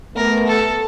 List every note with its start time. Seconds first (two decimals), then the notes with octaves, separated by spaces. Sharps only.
0.16 A3 B3 A#4
0.47 A4